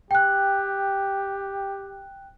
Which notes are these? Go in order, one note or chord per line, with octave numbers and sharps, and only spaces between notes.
G4 G5 F#6